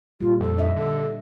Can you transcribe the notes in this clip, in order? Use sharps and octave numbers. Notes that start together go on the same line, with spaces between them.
A#2 G3 F4
F2 A4
D4 D#5 E5
D3 A4